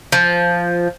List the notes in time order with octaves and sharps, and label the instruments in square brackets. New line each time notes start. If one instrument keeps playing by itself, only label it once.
[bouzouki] F3